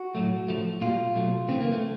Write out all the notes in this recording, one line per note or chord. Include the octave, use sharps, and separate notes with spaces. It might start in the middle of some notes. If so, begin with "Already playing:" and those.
Already playing: F#4
A2 F#3 A3
A2 F3 A3
A#2 G3 F4
B2 F#3 A3
C#3 E3 A3 C4
A#3
A3